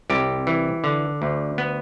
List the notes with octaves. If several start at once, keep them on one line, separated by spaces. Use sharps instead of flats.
C2 G4
E3
D3
D2
B3